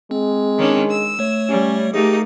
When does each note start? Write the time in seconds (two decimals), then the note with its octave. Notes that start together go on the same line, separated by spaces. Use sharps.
0.11 G#3 C4
0.58 D#3 C#4 D4
0.91 E6
1.19 A3 C#5
1.49 G3 C#4
1.94 A3 A#3 D#4 G4 G#4